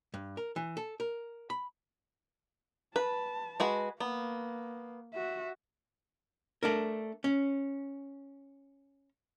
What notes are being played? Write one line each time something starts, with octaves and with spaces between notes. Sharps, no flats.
G2
A#4
E3
A4
A#4
B5
B4 A5
G#3 F#4 B4
A#3 B3
F#4 E5
A3 D4 A#4
C#4